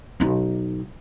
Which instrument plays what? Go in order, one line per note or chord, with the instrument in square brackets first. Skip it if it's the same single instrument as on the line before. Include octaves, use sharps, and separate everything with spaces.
[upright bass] B1 D#4